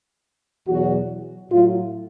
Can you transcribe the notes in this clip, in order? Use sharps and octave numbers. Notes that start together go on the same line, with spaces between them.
E2 B2 F#3 F#4
A2 F#3 F4